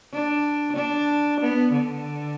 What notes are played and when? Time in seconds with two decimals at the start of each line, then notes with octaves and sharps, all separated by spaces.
0.13 D4
0.77 D4
1.41 B3
1.73 D3